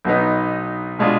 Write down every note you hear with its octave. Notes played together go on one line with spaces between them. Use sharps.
B1 B2 B3 D#4
B2 G#3 D4 F4